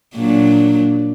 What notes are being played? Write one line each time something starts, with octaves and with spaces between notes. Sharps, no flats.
A#2 F#3 D4